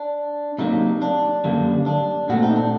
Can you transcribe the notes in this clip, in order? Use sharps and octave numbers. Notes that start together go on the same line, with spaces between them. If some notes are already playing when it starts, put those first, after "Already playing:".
Already playing: D4
C3 F#3 A#3 D#4
D4
F#2 D3 G3 A#3
D4
A#2 A3 C4 F#4
D#4
D4